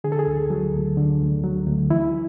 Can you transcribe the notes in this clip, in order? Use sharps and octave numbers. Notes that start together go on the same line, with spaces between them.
D3 G#4
A4
G#4
D2
F#3
D2
D3
D2
F#3
D2
E3 E4